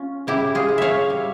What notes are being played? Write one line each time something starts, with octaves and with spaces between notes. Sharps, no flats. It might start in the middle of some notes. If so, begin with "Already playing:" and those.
Already playing: C#4 F4
C#3 E4 G4
F4 G#4
E4
C#5 E5 F5
G3